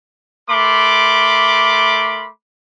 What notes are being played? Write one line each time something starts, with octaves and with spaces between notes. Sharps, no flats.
A3 A#4 B5 C6 D6